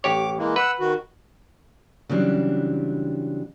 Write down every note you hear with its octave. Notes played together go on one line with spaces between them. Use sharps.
A1 G4 C#5 D6
E3 G#3 A#3
B4 F#5 E6
D#3 F#4
C#3 E3 F#3 G3 C4 D4